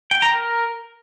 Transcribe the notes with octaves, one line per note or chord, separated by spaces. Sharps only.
G5
A#5
A#4